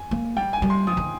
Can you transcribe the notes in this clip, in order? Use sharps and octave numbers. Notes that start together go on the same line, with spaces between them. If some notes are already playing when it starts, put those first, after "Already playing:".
Already playing: G#5
A#3
G3 G5
G#5
G3
C6
F3 D#6
D#3